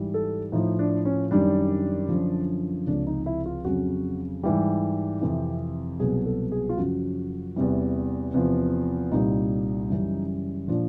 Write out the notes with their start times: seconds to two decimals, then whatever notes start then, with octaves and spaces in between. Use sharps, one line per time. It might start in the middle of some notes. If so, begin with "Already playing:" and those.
Already playing: G#2 E3 G3
0.14 A4
0.52 A2 F3 D#4
0.79 D4
1.05 C#4
1.31 F#2 D#3 G3 D4
2.09 F#2 D3 F3
2.87 C#2 C3 F3 D4
3.07 D#4
3.26 E4
3.46 F4
3.65 F2 C#3 F#3 F#4
4.43 G#2 E3 G3 G4
5.21 F2 C3 E3
6.00 C2 B2 F#3 G#4
6.26 A4
6.52 G#4
6.69 F4
6.77 F#2 C#3 F3 F#4
7.56 E2 C3 E3 G3
8.34 E2 C3 F3
9.12 C2 A#2 G3 D#4
9.90 F#2 C#3 E3 G3
10.68 A#2 F3 D4